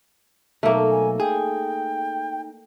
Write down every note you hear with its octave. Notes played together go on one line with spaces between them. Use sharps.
B1 A3 A#3 D#4 A4
G#5
G#4 G5